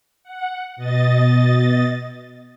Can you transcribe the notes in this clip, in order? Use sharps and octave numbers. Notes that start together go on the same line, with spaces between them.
F#5
B2 D#5 A6